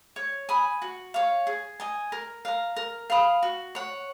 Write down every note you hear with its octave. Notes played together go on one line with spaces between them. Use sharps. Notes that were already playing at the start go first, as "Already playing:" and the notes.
C#5
G#5 B5 D#6
F#4
C#5 F5
G#4
D#5 G#5
A#4
F5 A#5
A#4
F5 B5 D#6
F#4
C#5 F#5